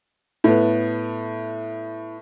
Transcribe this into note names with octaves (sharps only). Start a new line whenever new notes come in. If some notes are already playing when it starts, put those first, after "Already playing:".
A2 B3